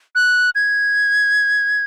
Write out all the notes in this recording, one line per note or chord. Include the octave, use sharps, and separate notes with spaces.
F#6
G#6